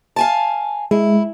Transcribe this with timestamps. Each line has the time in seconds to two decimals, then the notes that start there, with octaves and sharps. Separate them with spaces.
0.16 F5 G#5 A5
0.91 G#3 E4